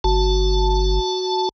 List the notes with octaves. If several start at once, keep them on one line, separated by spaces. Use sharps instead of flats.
G1 F#4 A5